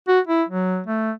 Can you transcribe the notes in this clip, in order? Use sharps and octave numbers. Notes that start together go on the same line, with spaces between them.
F#4
E4
F#3
A3